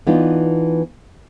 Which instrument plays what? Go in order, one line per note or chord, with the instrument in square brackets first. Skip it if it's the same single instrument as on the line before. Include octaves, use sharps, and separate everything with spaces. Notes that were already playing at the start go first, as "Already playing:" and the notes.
[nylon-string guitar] E3 B3 D4 D#4 F4